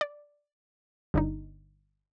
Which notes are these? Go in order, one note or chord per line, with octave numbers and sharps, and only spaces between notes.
D5
G1 D4 D#4